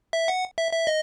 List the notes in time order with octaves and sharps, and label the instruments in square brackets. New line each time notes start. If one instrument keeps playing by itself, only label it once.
[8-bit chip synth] E5
F#5
E5
E5
D#5